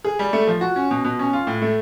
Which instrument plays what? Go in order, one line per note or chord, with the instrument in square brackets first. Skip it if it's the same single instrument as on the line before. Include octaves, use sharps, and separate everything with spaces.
[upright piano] G#4
G3
A3
F3
F#4
C#4
B2
B2
C#4
F4
A2
A3